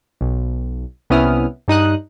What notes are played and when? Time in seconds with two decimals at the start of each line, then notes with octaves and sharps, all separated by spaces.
0.21 B1
1.10 C2 B3 C#4 E4 D#6 F6
1.68 G2 D#4 D#6 F#6